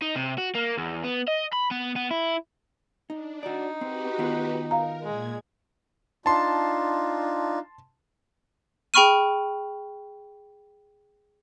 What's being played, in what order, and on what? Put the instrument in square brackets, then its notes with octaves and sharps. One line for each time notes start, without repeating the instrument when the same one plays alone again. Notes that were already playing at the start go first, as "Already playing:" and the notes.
[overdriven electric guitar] D#4
C3
F#4
A#3
E2
B3
D#5
B5
B3
B3
E4
[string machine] D4 [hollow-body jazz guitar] D#4
[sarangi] D#4 [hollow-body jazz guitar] F#4 D5
[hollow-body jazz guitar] C4 [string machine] F#4 G4 B4
[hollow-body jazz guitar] D#3 B3 F4
[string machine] A#4 [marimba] F5 A#5
[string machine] A#2 G#6 [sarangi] G#3
[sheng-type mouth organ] D4 D#4 F4 [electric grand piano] A5 C6
[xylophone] G#4 G5 B5 C#6 F6 D#7